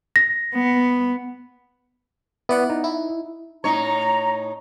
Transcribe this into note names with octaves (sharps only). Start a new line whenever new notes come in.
A#6
B3
B3 E4 D5 F#5
D#4
E4
A2 D#4 C#5 A#5